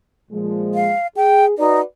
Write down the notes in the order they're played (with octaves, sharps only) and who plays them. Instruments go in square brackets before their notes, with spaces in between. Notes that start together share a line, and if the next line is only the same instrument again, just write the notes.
[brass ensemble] A#2 F3 G#3
[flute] F5
[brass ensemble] G#4 [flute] G5
[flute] D#4 [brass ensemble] F#4 B4 D5